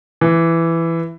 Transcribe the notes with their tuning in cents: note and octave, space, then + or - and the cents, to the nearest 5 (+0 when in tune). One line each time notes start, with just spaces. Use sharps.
E3 +10